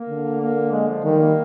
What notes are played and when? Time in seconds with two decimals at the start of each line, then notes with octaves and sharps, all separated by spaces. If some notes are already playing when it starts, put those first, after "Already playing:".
Already playing: A#3
0.10 D3
0.41 A#3
0.72 G#3
0.88 F3
1.03 D#3 G3
1.19 A#3